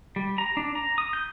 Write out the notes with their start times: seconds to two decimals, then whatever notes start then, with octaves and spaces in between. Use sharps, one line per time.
0.16 G3
0.38 A#5
0.57 D4
0.75 A#5
0.98 D#6
1.13 G6